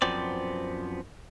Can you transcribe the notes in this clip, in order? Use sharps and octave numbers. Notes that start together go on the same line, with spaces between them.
F#2 F3 B3 C4 D5